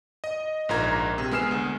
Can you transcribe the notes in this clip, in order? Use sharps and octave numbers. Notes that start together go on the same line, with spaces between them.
D#5
A#1 G#2 F4 A#4 A#5 G#6
C3
G#3 B3 G#4 F6 C7 E7
D2